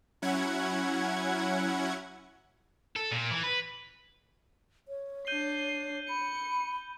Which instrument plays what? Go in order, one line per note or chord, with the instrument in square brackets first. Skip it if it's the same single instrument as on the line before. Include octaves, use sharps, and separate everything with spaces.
[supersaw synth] F#3 C#4 E4 F#5 G#6
[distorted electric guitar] A4
A#2
E3
B4
[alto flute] C#5
[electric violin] D4 C7 [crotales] G6 D#7 G7
[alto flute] B5 [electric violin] C#7